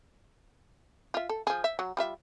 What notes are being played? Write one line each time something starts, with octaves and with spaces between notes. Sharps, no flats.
F4 E5
A4
F3 G#4
E5
F#3
G3 F4 E5